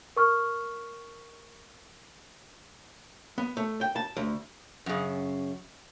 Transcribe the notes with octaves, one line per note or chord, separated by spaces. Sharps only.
A#4 C#6 F6
B3
A3
G5
A5
D2
F#2 C#3